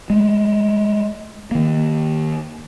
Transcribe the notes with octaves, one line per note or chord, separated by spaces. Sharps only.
G#3 A3
D#3 A#3